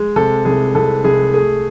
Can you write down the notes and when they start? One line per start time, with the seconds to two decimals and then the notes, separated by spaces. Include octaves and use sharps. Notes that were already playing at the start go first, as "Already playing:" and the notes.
Already playing: G#3
0.16 C3 A4
0.45 C2 G#4
0.75 C2 A4
1.04 C2 G#4
1.34 A3 G#4